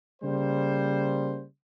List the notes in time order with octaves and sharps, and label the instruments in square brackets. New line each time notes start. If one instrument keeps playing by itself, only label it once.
[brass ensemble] C#3 G3 A#3 C5